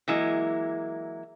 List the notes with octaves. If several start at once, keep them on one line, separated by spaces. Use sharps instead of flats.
E3 F#3 G#3 A#3 E4